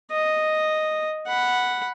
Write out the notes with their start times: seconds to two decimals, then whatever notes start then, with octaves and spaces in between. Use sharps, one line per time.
0.11 D#5
1.27 F#5 B5